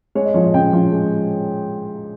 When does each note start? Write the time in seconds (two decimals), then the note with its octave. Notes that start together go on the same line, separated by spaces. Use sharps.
0.15 G#3 C#5
0.25 D#5
0.34 F3 C#5
0.45 D#5
0.54 C#3 G5
0.73 F3
0.92 G#3